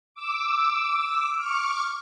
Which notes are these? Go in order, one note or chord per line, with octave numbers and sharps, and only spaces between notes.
D6 E6
C#6 D6 F6